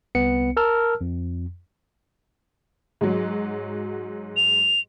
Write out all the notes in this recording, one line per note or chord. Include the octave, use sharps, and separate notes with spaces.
C2 B3 C#7
A#4 A5 E6 F6
F2
G#2 F#3
F7